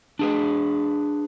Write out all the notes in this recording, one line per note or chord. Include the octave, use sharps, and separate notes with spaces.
D4 G#4 B4